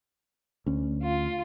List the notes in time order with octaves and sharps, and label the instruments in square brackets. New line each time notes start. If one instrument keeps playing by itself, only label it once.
[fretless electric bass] D2 C#4
[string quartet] F4